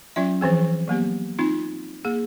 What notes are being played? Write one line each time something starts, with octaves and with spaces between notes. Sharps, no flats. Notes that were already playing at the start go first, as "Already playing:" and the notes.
F#3 C#4 F4 E5
E3 F3 C4 G#4
F#3 A#3 B3 G4
C4 D#4 F4
A#3 G#4